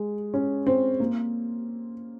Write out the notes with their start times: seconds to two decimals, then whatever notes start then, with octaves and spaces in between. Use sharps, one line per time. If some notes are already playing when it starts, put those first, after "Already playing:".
Already playing: G#3
0.34 C#4
0.67 C4
1.00 A#3